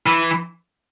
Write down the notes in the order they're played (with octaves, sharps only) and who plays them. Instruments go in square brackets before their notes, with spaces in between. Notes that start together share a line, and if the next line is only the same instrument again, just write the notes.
[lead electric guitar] E3